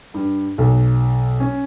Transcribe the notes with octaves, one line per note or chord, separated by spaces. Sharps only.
G2
B1
C#4